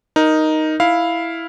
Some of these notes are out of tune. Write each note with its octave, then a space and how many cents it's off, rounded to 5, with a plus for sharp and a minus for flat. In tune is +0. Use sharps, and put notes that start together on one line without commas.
D#4 +0 A#4 +5
E4 +0 F5 +0